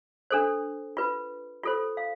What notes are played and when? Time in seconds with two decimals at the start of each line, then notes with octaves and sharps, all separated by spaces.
0.31 D4 A4 C5
0.97 F4 B4
1.63 F4 A4 C5
1.97 F5